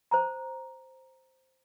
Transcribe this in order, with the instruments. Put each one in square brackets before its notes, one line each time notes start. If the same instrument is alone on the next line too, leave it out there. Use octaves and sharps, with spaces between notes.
[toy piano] C5 A5 A#5